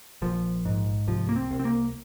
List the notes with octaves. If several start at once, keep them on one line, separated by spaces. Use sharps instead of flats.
A#1 F3
G#2
C2 F3
A#3
C4
C2
C4
A#3